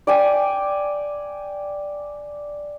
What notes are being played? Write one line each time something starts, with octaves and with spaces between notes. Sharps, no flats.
D5 G5 G#5